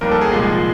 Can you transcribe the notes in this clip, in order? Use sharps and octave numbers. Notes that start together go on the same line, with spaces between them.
D#2 D#3 G3 A#4
A4
G#4
C2 A#2 F3 G#3